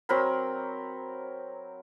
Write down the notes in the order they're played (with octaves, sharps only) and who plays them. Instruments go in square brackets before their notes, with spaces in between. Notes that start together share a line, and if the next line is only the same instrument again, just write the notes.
[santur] F#3 C4 A#4 B5